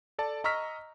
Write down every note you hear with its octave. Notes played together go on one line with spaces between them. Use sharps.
A4 D5 A5
D#5 A#5 C#6 E6 F6 B6